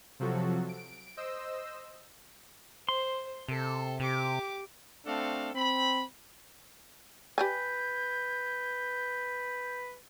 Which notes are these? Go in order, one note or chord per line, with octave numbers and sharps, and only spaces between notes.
C3 F3 F#3 F#4 A4
D7
C5 D#5 E6
C5 C6
C3 A4
C3 G4 D6
A3 C4 D4 F#4 A4 F5
C4 B5
G4 B4 D5 G#5 G6